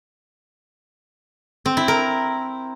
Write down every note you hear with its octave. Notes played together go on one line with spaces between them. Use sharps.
C4
E4
A#4